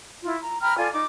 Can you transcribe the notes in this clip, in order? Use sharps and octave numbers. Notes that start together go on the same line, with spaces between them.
E4 F4
A#5
G5 A#5 B5 F6
F4 A4 D5 G#5
D#4 D6